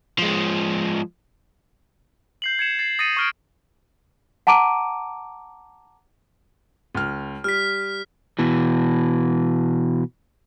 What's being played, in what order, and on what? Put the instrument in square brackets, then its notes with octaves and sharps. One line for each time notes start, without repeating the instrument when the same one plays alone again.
[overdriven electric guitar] F3 G#3
[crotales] G6 C7 F#7
G#6 C#7 E7
A6 C7
D#6 A6 A#6 C#7 D#7
C#6 F6 D7
[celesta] F#5 A5 A#5 D6 D7 D#7
[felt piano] C#2 F6
[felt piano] G3 [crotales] F6 B6
[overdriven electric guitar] B2 E3